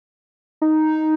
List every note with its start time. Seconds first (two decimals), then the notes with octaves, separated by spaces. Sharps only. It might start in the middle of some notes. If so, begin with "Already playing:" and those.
0.62 D#4